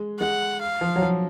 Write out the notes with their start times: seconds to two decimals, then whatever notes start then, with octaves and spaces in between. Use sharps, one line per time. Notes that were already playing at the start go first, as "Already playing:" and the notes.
Already playing: G#3
0.19 G#3 F#5
0.62 F5
0.81 F3
0.96 F#3
1.02 F3